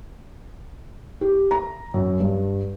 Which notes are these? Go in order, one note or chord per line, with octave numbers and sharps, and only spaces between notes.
G4
A#5
F#2
G2